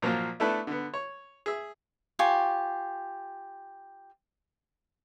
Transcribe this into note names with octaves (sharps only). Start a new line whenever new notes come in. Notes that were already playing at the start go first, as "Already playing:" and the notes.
A#2 F3 F#3 A#3 F4
A3 B3 D4 E4 A4 B4
D3 B3
C#5
G#4 E5
F4 G4 G#5 C#6